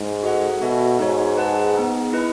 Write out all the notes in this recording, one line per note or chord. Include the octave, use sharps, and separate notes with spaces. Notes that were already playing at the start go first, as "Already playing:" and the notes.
Already playing: G#2
F#4 A4 D#5 F#5
B2 F#4 A4 E5
G#2 D#4 F#4 C#5
G#4 B4 F#5 A5
B3 D#4 G#4
E4 B4 D#5